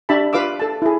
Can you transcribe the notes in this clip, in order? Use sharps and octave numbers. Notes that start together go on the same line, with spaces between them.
D4 G4 E5 A5 B5
F4 B4 F5 D6 E6
A4 A5
E4 G#4